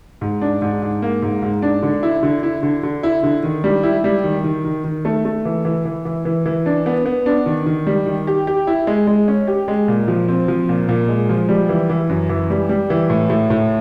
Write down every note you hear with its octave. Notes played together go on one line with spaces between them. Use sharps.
G#2
D4
G#2
G#2
A#3
G#2
G#2
D4
D3
E4
D3
E4
D3
D3
E4
D3
D#3
G3
E4
G3
D#3
D#3
D#3
D#3
A3
A3
E3
E3
E3
E3
E3
E3
D4
B3
B3
D4
D#3
D#3
G3
D#3
G4
G4
E4
G#3
G#3
C#4
G4
G#3
A#2
F3
C4
F3
A#2
A#2
G#3
F3
G3
E3
E3
F#2
E3
G3
G3
E3
A2
A2
A2